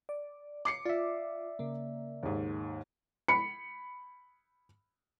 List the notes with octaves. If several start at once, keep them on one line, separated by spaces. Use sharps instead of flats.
D5
D6 C7 C#7
F4 D5 E5
C#3 A#3
D#2 G#2
B5 C#7